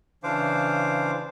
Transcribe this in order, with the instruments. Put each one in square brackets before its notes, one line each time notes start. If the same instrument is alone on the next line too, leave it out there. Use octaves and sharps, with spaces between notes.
[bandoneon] C#3 E3 D4 C5 F5 D6